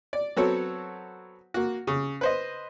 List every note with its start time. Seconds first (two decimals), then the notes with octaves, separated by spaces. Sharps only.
0.13 D5
0.36 F#3 B3 C4 F#4 A4 C#5
1.54 A#3 F#4
1.87 C#3
2.21 B4 C5 D#5